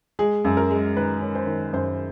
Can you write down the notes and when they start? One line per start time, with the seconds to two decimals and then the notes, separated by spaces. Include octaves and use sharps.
0.19 G#3 G#4
0.44 F#2
0.57 A#4
0.70 G#3
0.96 D#3 B4
1.22 C#4
1.35 C5
1.47 D#3
1.72 F#2 C5